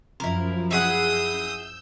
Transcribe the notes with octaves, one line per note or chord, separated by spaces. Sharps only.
F#2 F3 E4 A#4
E4 G#4 F#5 D#6 E6 G6